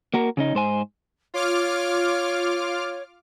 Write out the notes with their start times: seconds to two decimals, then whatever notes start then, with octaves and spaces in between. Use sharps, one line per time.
0.14 A#3 F#4 A#4
0.37 C#3 C#4 D#4
0.55 G#2 C5 G#5
1.34 F4 C#5 D6 F6